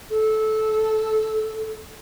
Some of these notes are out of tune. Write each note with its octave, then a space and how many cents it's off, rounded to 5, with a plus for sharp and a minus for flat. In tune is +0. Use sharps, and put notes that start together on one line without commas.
A4 -15